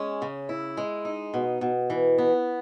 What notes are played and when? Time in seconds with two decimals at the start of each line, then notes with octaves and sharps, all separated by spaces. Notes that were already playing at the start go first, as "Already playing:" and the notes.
Already playing: G#3 C#4
0.22 C#3
0.49 E4
0.77 G#3
1.05 D#4
1.34 B2
1.61 B2
1.90 E3
2.18 B3